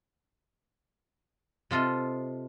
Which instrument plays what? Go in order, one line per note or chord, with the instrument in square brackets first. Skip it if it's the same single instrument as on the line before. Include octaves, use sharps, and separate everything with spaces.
[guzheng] C3 F4 A4 D#5